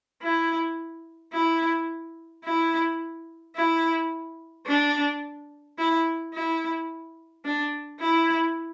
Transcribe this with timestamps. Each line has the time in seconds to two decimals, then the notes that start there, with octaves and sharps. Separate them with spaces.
0.22 E4
1.33 E4
2.44 E4
3.56 E4
4.67 D4
5.78 E4
6.34 E4
7.45 D4
8.00 E4